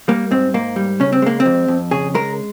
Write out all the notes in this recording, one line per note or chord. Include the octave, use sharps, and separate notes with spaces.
G3 A#3
G#2 C4
G#2 A#3
G3
C#3 C#4
C4
G#3 A#3
C4
F2
F2
C#3 G#4
G#3 A#4